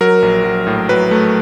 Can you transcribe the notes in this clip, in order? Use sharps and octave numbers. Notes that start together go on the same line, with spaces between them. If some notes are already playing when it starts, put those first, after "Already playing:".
F#3 A#4
A#1
F#3
A2
F#3 B4
A3